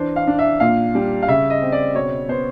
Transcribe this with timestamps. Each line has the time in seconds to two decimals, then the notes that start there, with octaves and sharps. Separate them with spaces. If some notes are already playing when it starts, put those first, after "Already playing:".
Already playing: E3 D4 C5
0.16 F5
0.27 D4
0.39 E5
0.60 A#2 F5
0.95 G3
1.22 F5
1.28 C#3 E5
1.50 D#5
1.62 C4
1.72 D5
1.95 B2 C#5
2.29 B3 C5